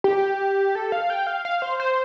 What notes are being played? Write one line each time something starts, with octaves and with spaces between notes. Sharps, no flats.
G4
A4
F5
G5
F5
F5
C5
C5